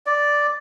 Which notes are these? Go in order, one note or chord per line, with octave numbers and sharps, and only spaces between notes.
D5